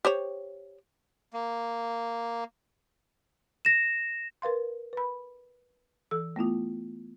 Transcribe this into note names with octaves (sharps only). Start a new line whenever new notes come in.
G4 C5 C#5
A#3
A#6 E7
A#4 B4 F5 C6
B4 B5
E3 A4 E6
A3 B3 E4 F4